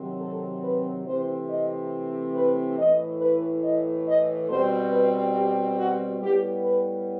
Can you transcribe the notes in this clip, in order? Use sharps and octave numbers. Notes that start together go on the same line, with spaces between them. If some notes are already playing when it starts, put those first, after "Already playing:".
Already playing: C3 D#3 F#3 C4
A4
B4
C3 E3 A3 C4 C5
D#5
B4
A2 E3 A3 D#5
B4
D#5
D#5
B2 G3 C4 C5
B4
G4
F#4
A2 G3 B3 G4
B4